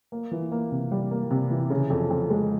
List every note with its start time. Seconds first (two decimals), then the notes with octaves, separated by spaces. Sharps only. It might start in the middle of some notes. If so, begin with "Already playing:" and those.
0.12 A#3
0.31 E3
0.52 A#3
0.71 C3
0.92 G3
1.11 A#3
1.31 C3
1.50 E3
1.70 C#3
1.90 F2
2.10 F2
2.30 G#3